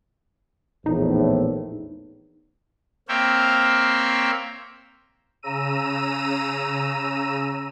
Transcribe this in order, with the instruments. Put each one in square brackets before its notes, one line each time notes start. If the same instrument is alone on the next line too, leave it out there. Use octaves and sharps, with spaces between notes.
[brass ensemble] A#1 E2 A2 [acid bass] D#4
[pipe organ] A#3 C4 C#5 E5 F5 G5
[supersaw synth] C#3 A#5 E6 D#7